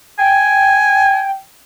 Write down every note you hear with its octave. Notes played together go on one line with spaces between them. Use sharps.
G5 G#5